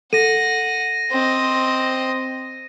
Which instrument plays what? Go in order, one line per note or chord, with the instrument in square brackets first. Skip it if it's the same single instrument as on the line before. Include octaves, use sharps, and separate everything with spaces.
[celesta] A4 [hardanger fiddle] F#5 [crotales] A#6 D#7
[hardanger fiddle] C4 D#5